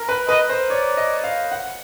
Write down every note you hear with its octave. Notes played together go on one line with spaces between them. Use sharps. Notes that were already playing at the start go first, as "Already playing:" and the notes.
Already playing: A#4
B4
B4 D#5
C5
C#5 D5
D#5
F5
F#5